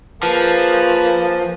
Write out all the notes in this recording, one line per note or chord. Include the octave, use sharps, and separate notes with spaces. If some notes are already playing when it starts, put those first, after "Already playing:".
F3 A#3 G#4 B4 A5